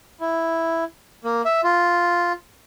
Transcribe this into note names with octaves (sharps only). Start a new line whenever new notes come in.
E4
A#3
E5
F4